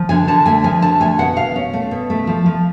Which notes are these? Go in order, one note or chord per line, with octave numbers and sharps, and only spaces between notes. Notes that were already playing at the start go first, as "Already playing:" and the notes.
Already playing: F3
D3 G#5
D3 A5
A3 G#5
F3 G#5
D3 A5
A3 G#5
B2 F#5
B2 F5
C#4
A3
B2
A3
F3
F3